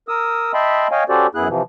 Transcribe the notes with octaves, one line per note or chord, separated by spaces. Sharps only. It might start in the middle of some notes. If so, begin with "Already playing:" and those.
A#4 D#6 E6
D#5 E5 G5 A5 B5 C6
C#5 D#5 F5 G5 G#5
C#4 F#4 G4 A4 C5 D5
F#2 B3 E4 G#4 F#6
C3 E3 F3